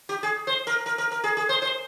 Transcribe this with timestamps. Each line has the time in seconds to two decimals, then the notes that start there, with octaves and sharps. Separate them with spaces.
0.09 G4
0.23 G#4
0.47 C5
0.67 A#4
0.86 A#4
0.98 A#4
1.12 A#4
1.24 G#4
1.37 G#4
1.49 C5
1.62 C5